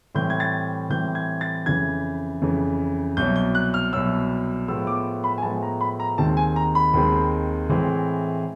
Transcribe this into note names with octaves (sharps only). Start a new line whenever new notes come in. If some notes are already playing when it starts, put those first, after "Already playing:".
A2 E3 G3 C4 G6
G#6
A6
A2 E3 G3 C4 G6
G#6
A6
F2 C#3 E3 G#6
F2 C#3 E3
C2 B2 F#3 G6
G6
F#6
F6
C2 B2 F#3 E6
A2 F3 G#3 B3 E6
D6
B5
G#5
A2 F3 G#3 B3 A5
A#5
B5
A#5
D#2 D#3 G#3 C4 A5
G#5
A#5
B5
D#2 D#3 G#3 C4
A2 E3 G#3 C4